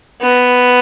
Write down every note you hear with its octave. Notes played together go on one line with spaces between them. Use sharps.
B3